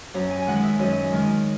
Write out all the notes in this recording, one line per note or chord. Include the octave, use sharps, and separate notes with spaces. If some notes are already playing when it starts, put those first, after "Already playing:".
F#2 A#5
G#5
D#3 G#3 F#5
E5
F#2 D#5
D#3 G#3